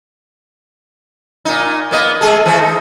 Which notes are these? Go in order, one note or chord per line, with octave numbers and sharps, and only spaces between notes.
A#2 D#4
A#3 B3 D#5
G#3 G#4 A4
E3 A3 C5
D#4